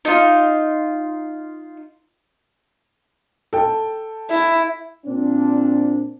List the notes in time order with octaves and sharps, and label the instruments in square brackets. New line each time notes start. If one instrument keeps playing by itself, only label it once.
[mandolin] D#4 F4
[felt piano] A4 G5
[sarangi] E4
[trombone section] A#2 C4 D4